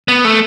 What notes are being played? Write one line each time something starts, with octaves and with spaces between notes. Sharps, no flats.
B3
A3